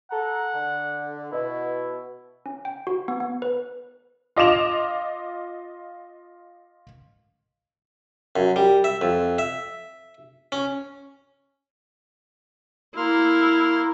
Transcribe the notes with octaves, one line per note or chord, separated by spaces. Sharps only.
A4 F#5 A#5
D3
B2 E4
C#4
G5
F#4
B3
B3
B4
F4 D#5 D6 E7 F7
F#2
G3
E5
F2
E5
C#4
A#3 E4 C6 F6